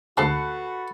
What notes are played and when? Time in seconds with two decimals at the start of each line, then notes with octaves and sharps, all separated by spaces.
0.17 D2 G#2 F#4 A4 B4 E5 A5 C7